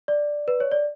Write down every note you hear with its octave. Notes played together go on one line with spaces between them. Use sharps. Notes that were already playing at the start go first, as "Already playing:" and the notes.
D5
B4
C#5
D5